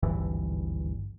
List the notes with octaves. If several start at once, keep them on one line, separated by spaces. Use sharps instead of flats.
G#1 D2 G2 E3